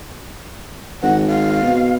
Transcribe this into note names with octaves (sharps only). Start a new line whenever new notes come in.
G#1 F#5
F5
B2